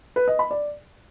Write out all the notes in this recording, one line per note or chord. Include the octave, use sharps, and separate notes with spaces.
B4
D#5
B5
D5